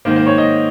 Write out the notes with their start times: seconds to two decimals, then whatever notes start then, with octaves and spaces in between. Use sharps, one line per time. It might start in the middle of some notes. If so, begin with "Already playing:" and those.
0.05 G#2 D#3 A#3 C5
0.16 C5
0.27 C#5
0.38 D#5